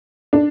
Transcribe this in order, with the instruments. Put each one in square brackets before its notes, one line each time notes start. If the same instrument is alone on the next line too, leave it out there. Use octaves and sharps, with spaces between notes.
[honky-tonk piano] D4